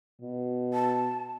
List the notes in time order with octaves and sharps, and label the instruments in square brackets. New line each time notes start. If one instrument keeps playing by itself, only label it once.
[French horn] B2
[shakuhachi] A5